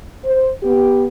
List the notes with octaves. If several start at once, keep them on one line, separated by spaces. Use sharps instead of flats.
C5
B3 G4